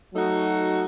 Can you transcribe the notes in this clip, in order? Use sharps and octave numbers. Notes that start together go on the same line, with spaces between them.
F#3 A3 D#4 F#4